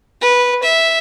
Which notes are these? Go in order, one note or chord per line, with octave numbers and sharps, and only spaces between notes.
B4
E5